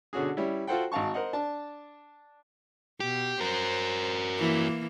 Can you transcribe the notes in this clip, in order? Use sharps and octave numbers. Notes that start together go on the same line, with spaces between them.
B2 D3 C#4 F#4 G#4
G3 C#4 E4
F4 F#4 A4 C5 F#5 G5
G#1 F#4 F5 A5 C#6
A#4 C5 D#5 F#5
D4 A5
B2 G4
F#4 A#4 C5
E3 A#3